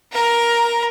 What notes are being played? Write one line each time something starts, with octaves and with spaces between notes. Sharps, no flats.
A#4 A#5